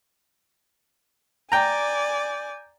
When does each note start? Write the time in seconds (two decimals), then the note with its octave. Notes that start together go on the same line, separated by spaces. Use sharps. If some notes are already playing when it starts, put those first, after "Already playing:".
1.52 D5 G5 G#5 A#5